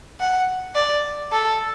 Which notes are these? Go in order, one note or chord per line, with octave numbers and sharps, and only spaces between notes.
F#5
D5
A4